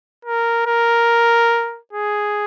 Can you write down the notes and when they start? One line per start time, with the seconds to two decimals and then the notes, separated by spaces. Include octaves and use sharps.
0.25 A#4
0.67 A#4
1.93 G#4